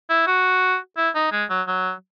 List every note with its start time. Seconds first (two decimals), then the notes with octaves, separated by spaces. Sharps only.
0.10 E4
0.27 F#4
0.97 E4
1.15 D#4
1.32 G#3
1.50 F#3
1.67 F#3